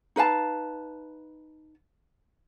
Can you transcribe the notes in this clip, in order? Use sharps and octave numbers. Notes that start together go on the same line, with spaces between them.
D#4 B4 F5 A5